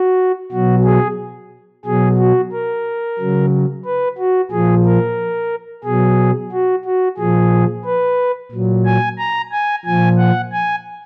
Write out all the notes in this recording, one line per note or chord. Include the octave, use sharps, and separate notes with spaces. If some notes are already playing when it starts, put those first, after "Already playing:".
Already playing: F#4
B2 F#3 F#4
G#4
B2 F#3 G#4
F#4
A#4
C#3 F#3
B4
F#4
A#2 F3 G#4
A#4
B2 F#3 G#4
F#4
F#4
A#2 F3 G#4
B4
A#2 F#3
G#5
A#5
G#5
A#2 F3 G#5
F#5
G#5